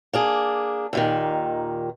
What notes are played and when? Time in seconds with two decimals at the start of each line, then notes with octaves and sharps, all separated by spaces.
0.13 A#3 D4 G#4
0.93 D#2 A#2 D#3